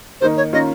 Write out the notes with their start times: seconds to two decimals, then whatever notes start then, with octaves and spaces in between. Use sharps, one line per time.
0.21 D#3 A#3 D#4 C5
0.37 C#5
0.53 D#3 A#3 C#4 F4 D#5